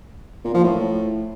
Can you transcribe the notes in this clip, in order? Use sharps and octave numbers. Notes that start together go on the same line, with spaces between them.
A#2
F3
A2